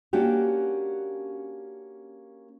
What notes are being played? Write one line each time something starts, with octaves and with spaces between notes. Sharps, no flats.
A#3 C#4 D4 F#4 G4